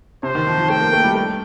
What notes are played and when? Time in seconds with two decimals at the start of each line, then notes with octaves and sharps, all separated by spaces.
0.23 C3 C5
0.35 D#3
0.47 F3
0.58 F3
0.69 A3 G5
0.81 A#3
0.93 A3
1.04 G3
1.15 A3